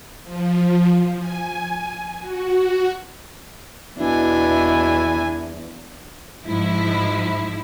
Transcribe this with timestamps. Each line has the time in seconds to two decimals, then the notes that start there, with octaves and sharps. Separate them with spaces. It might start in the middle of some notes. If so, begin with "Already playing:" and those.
0.23 F3
1.18 G#5
2.21 F#4
3.99 E2 B2 D4 E4 G#5
6.45 G#2 F3 E4